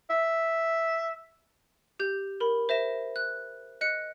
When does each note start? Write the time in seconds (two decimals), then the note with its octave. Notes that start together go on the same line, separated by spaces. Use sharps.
0.10 E5
2.00 G4 G6
2.40 A#4 B5
2.69 C5 E5 A#6 E7
3.16 F#6
3.81 D#5 F#6 C#7